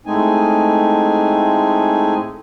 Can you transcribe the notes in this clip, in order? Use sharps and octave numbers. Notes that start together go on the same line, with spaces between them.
A2 G#3 A3 C4 D#4 G#5